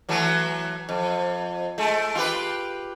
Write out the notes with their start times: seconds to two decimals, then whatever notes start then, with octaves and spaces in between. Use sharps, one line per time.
0.09 E3 F#3 A3
0.89 F2
1.78 G#3 A3
2.15 F4 G4 B4